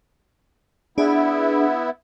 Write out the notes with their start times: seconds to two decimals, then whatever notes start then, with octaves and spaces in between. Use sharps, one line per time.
0.98 B3 D4 E4 G#4